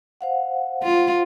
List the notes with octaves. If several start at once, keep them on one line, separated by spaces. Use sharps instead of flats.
C5 F5 F#5
F4